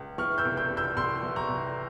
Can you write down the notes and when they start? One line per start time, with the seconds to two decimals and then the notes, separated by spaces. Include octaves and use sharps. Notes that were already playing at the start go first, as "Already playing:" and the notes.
Already playing: C#2
0.18 E3 C#6 F6
0.38 E6 G6
0.45 C2
0.57 E6 G6
0.70 C3
0.77 E6 G6
0.97 C2 C6 E6
1.23 E3
1.36 A#5 C#6
1.49 C2